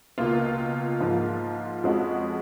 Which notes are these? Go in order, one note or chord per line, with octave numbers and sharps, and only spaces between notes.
C#2 B2 A#3 F4
G#2 F3 A#3 F4
F2 F3 G#3 C#4 F#4